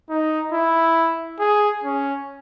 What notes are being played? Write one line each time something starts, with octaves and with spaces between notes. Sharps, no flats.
D#4
E4
G#4
C#4